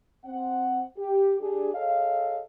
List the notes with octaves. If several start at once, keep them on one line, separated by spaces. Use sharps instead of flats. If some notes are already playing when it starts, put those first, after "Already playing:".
C4 F#5
G4
D4 G4 G#4
G#4 A4 C#5 D#5 F5